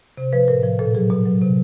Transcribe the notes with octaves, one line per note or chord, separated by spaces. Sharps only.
C3 C5
F3 B4
A2 A#4
F3
A#2 A4
F#3 G#4
B2
F#3
C3